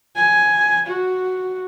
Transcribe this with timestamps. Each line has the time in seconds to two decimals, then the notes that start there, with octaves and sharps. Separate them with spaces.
0.16 G#5
0.87 F#4